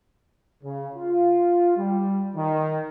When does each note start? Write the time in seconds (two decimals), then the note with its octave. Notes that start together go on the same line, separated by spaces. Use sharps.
0.64 C#3
0.95 F4
1.77 G3
2.36 D#3